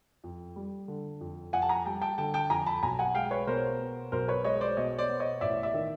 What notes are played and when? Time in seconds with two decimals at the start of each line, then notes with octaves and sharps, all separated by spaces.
0.24 F2
0.56 G3
0.88 D3
1.21 F2
1.53 F2 F#5 G#5
1.62 A5
1.69 G#5 A#5
1.85 G3 G5 A5
2.02 G5 A5
2.18 D3 G5 A5
2.34 G5 A5
2.50 F2 G#5 A#5
2.66 A5 B5
2.83 B1 G#5 A#5
2.99 F#5 G#5
3.15 G#3 F5 G5
3.31 B4 C#5
3.47 B2 A#4 C5
3.80 B3
4.12 B1 A#4 C5
4.28 B4 C#5
4.44 G#3 C#5 D#5
4.61 C5 D5
4.77 B2 C#5 D#5
4.99 C5 D5
5.09 B3
5.20 C#5 D#5
5.41 A1 D5 E5
5.63 D5 E5
5.74 D#3